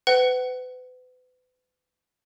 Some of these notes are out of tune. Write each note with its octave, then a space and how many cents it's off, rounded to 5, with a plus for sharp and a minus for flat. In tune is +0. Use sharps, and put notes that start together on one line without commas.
B4 +35 F#5 +30